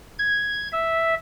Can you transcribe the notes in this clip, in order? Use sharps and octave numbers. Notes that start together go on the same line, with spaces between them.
G#6
E5